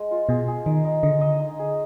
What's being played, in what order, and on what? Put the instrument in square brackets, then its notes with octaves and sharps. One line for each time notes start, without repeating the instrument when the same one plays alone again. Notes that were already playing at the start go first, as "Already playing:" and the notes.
Already playing: [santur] G#3
F4
[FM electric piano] B2 [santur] G#4
[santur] G#4
[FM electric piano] D#3 [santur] D#4
[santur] D#4
[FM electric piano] D3 [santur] D#5
[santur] D#5
D#4
G#4